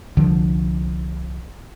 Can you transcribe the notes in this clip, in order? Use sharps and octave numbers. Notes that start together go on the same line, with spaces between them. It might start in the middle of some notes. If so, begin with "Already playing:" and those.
C2 D3 F3